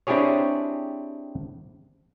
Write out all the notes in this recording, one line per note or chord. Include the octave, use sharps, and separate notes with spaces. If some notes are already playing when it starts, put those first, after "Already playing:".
C4 D4 E4 G4 G#4 C#5